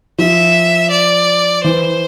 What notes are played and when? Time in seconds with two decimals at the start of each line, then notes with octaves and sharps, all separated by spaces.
0.19 F3 E5
0.91 D5
1.64 E3 C5